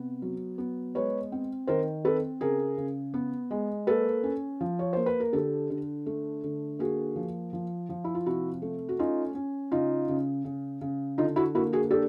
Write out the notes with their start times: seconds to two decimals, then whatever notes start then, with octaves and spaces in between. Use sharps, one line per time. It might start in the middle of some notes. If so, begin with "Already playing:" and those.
Already playing: C3 B3
0.22 F#3
0.58 B3
0.95 G#3 B4 C#5
1.32 C4
1.67 D#3 A#4 C5
2.05 C4 A4 B4
2.41 C#3 G#4 A#4
2.77 C#3
3.14 B3
3.51 G#3
3.87 A#3 A4 B4
4.23 C#4
4.61 F3
4.79 C#5
4.93 A#3 C5
5.06 B4
5.20 A#4
5.33 D3 G4 A4
5.70 D3
6.06 A3
6.44 D3
6.79 A#3 F#4 G#4
7.16 F3
7.53 F3
7.89 F3
8.04 E4
8.15 F4
8.26 C3 E4 F#4
8.62 A3
8.89 F#4
8.99 C#4 D#4 F4
9.35 C#4
9.72 C#3 D#4 F4
10.09 C#3
10.45 C#3
10.81 C#3
11.18 D3 D#4 F4
11.36 E4 F#4
11.55 A#3 E4 F#4
11.73 F#4 G#4
11.91 D4 G4 A4